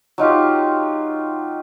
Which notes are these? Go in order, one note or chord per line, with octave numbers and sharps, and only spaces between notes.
F#3 D#4 F4 G4